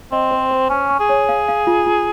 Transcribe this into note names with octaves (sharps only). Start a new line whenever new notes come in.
C4 D#5
C5
C5
C#4 G#5
C#6
G#4
C#5
F5
F5
F4
F4